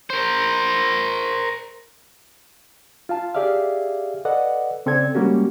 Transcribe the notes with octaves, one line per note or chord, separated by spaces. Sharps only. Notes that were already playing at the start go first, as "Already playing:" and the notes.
A#4 C5
F4 F5 A5
G4 G#4 D5 E5 F5
A4 B4 D5 D#5 F#5
C#3 C4 A4 D5 G#6
G3 G#3 A#3 C#4 F#4 G4